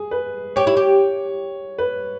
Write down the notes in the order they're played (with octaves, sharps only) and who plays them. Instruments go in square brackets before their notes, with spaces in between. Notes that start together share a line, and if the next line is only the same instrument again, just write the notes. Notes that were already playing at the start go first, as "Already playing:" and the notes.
Already playing: [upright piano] G#4
B4
[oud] G4 [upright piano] C#5
[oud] E4
G4
[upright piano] B4